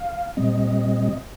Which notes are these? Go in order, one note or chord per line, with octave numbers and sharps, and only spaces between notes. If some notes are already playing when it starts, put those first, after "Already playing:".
Already playing: F5
A#2 G3 C4 D#5